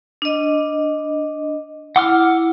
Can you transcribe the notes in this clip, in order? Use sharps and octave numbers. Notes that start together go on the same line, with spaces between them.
D4 D#5
E4 F#5 D6 F6